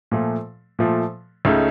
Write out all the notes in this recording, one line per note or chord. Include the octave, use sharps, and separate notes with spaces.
A#2 F3 A3
A#2 F3 A3
C#2 C#3 A3 D#4